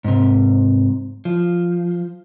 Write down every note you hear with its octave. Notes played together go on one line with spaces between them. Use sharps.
G#2 C3
F3